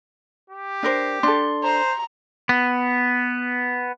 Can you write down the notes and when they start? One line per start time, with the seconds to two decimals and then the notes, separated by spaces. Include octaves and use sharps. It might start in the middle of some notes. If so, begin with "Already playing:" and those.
0.50 G4
0.83 D4 A#4 C5
1.23 D4 A4 C6
1.63 C5 A#5
2.49 B3